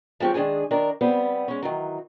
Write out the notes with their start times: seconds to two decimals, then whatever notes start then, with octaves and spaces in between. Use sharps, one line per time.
0.20 F3 G#3 C4 G4 C#5
0.34 D#3 G#3 D4 G#4 G#5
0.71 D#3 D4 A#4
1.01 G3 B3 C4
1.48 G#3 C#4
1.62 D#3 E3 F#3